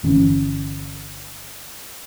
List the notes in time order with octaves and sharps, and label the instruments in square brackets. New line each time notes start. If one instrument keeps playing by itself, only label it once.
[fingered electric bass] G1 E3 A#3 C#4